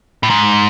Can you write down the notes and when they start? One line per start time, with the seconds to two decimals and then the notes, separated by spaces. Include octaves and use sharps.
0.23 A2
0.30 G#2